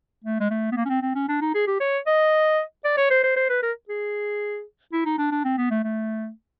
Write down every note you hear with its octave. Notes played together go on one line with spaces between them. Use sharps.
A3
G#3
A3
B3
A#3
C#4
C4
C4
C#4
D4
D#4
G#4
G4
C#5
D#5
D5
C#5
C5
C5
C5
B4
A#4
G#4
E4
D#4
D4
D4
C4
B3
A3
A3